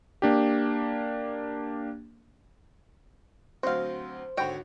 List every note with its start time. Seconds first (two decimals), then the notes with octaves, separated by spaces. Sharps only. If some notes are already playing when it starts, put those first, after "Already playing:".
0.22 A#3 D4 G4
3.63 D2 F#3 C4 F#4 C5 F5
4.37 G#1 D3 F#4 C#5 G5